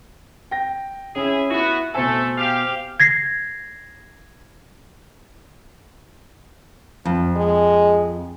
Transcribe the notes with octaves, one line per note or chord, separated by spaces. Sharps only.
G5 A#6
C#4 E4 G#4 E5
B3 E4 F#4
B2 A3 A4 C5 G#5
G4 F5
G#6 A#6 C7
F2 F3
G#3